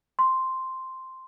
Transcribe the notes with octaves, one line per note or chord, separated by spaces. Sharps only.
C6